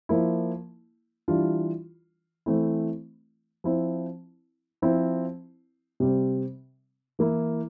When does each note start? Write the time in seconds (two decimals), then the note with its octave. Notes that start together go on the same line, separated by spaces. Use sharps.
0.09 F3 A#3 E4
1.28 E3 G3 D4 F4
2.46 E3 A3 C4 E4
3.64 F3 C4 E4
4.82 F3 C4 E4
6.00 C3 G3 C4
7.19 E3 A#3 E4